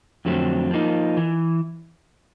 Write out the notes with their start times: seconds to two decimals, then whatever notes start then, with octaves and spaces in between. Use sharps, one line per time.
0.25 F2 D3 F#3 A3 C4
0.71 F3 A#3 D#4
1.17 E3